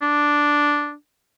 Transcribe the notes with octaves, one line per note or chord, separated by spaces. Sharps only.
D4